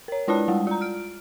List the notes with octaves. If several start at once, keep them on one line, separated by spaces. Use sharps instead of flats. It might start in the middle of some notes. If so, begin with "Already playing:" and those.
A#4 C#5
G#3 D4 E4 D5 A5
G3 G#3
F4 A#5
F6 D7